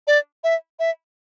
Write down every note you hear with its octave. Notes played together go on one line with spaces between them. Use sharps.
D5
E5
E5